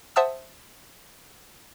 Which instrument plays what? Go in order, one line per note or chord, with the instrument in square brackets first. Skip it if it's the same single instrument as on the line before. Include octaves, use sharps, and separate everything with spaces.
[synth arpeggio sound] C5 E5 F#5 A5 D#6 E6